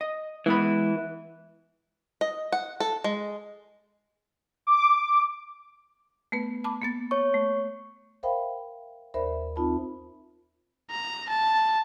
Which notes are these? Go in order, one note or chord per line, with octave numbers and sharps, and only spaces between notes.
D#5
E3 G#3 B3 B5
D#5
F#5
A4
G#3
D6
A3 B3 B4
A5 B5 D6
A#3 B3 A6
C#5 C#6
A3
A#4 C5 E5 F5 G5 B5
D#2 A#4 C5 D5 E5 B5
C4 D#4 F4 A5 B5
A#5
A5